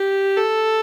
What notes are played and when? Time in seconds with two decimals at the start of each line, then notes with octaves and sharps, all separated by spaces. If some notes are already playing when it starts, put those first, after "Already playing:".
Already playing: G4
0.36 A4